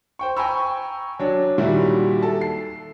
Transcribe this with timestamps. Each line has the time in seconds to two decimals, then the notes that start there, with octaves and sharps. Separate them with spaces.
0.19 C5 G5 C#6
0.37 G5 G#5 A#5 B5 C#6 E6
1.19 F#3 D4
1.58 A#2 D#3 G3 E4 F#4
2.22 A4 A5
2.41 C7